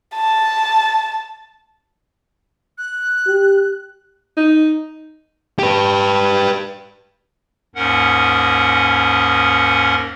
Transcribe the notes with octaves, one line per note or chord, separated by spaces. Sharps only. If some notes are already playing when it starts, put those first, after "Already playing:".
A5
F#6
G4
D#4
G4 B4
D#2 G#2 C#4 A#4 F#5